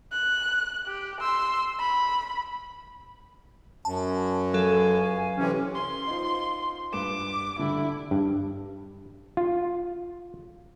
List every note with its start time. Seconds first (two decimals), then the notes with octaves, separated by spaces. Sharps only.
0.13 F#6
0.86 G4
1.21 C6 E6
1.80 B5
3.85 F#2 A5
4.54 C#2 F#3 A4 F5 G#5
5.37 C3 E3 C#4
5.75 C6
6.07 D#4 F4 C5
6.93 G2 B4 D6 E7
7.59 D3 G3 E4
8.11 G2
9.37 F4